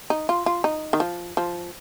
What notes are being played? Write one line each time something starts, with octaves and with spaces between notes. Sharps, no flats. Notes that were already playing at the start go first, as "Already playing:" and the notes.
D#4
F4
F4
D#4
D#3
F3
F3